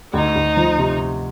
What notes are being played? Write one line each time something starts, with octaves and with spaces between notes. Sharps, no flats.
D2 D#4
D2
F3
C3